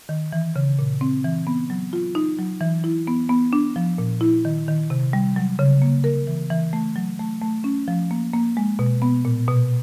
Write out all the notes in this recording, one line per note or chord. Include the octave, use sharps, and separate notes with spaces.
D#3
E3
C#3
A#2
C4
E3
B3
F#3
F4
D#4
F#3
E3
E4
B3
B3
D4
F3
A#2
E4
D#3
D#3
C3
G3
F#3
C#3
A#3
A#4
E3
E3
A3
F#3
A3
A3
C#4
F3
A#3
A#3
G#3
B2
B3
A#2
B2